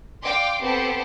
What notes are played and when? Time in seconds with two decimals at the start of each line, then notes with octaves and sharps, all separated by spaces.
0.22 D5 F5 G5 C6 D6
0.61 B3 C4 G4 A4 C5